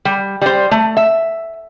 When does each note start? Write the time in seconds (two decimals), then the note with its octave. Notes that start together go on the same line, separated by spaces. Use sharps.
0.05 G3
0.42 G3 C5
0.71 A3
0.97 E5